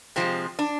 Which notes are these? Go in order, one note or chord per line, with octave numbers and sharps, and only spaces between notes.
C3 F3 G#3 C4
D4